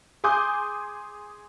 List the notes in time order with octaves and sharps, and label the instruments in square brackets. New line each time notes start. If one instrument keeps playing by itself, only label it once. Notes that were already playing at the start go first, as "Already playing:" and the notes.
[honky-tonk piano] G#4 G#5 C6 D6 D#6 G6